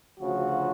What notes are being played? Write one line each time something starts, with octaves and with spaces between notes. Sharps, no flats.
D2 C#3 F3 F#4